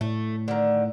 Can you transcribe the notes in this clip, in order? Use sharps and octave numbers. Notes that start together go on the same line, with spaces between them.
A2 A3
D3 D#3